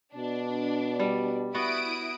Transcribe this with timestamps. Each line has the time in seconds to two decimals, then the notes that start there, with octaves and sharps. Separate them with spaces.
0.15 B2 D4
1.00 G3
1.55 B3 E4 F#4 D#6 D7